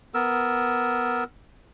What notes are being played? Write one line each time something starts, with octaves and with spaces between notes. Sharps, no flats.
B3 A#4 E6